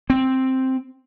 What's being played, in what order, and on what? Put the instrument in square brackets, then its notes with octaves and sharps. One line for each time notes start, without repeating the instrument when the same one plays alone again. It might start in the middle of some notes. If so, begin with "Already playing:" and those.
[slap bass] C4